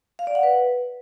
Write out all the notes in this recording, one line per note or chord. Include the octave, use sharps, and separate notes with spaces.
F5
D5
F#5
B4